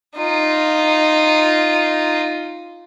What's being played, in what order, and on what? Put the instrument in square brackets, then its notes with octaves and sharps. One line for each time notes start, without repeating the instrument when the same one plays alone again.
[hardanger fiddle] D#4 F4